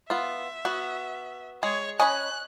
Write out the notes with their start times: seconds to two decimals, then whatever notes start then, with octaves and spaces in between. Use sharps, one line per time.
0.10 B3 F4 E5
0.65 B3 F#4
1.63 G#3 G#4 C#5
2.00 C#4 C#5 D#5 G#5 B5 F#6